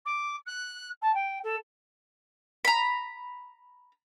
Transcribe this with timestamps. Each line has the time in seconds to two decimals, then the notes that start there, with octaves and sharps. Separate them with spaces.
0.05 D6
0.46 F#6
1.02 A5
1.14 G5
1.43 A4
2.65 A#5 B5